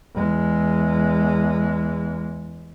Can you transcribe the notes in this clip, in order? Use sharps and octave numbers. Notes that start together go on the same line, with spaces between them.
E2 G#3